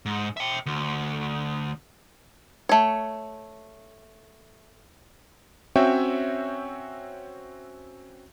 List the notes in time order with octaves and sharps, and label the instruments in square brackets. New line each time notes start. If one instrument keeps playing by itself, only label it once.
[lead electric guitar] G#2
E5 G5
D2
[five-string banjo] A3 C#5
[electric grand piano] C4 C#4 F#4 C#5 E5 G5